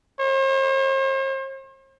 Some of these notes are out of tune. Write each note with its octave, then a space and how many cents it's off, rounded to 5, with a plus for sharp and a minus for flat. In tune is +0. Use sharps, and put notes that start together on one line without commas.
C5 +45